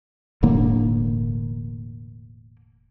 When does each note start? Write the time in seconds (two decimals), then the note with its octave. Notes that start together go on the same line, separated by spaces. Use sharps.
0.43 E1 A2 D3 A#3